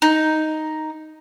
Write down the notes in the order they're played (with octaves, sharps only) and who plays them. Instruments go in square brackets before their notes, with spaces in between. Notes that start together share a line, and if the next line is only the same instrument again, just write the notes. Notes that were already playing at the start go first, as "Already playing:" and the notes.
[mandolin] D#4